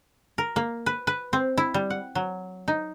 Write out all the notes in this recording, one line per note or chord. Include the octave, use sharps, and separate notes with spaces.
A#4
A#3
B4
B4
C4
E4
G3
F#5
F#3
D#4